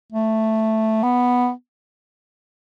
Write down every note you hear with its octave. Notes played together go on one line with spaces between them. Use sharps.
A3
B3